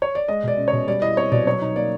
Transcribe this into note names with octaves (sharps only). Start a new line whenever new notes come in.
C#5
D5
G#3 D#5
B2 D5
C#4
C#5
B2
G3 D5
E4 D#5
C4 C#5
B2 D5
F#3 C#5
D#4
A#3 D5